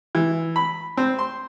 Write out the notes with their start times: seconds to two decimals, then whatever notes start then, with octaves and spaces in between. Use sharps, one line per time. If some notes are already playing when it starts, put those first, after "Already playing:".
0.15 E3
0.56 B5
0.97 C4
1.19 C6